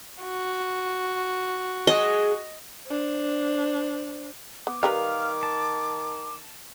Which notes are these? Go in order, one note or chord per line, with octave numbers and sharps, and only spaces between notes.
F#4
F#3 G#3 G#4 D#5
D4 C5
B3 D6
D#3 G3 A#4 B4 F5
A5